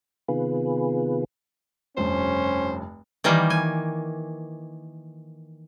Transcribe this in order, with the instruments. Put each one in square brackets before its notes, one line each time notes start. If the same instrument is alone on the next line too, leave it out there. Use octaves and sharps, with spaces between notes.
[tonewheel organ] C3 D#3 B3 F4 G#4 B4
[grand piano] F1 G2 [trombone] C#4 [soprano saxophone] C5
[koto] D#3 E3 G3 A#3
G#5